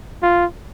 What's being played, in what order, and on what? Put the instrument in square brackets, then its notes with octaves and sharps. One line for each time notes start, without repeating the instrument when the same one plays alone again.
[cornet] F4